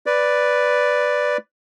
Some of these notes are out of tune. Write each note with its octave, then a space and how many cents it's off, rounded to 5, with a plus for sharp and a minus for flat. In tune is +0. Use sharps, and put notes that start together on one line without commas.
B4 +0 D5 +0